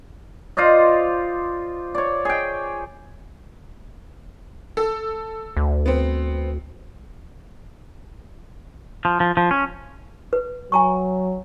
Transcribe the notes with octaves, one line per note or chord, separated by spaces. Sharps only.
F4 C5 D5 D#5
C#5 D5
G#4 G5
A4
D2
B3 C4
F3
F3
F3
C#4
B4
F#3 G#5 A#5 C#6